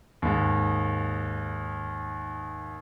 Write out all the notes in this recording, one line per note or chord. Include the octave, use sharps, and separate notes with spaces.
D#2 G#2